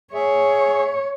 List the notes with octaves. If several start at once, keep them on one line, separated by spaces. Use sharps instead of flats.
G#4 C#5 E5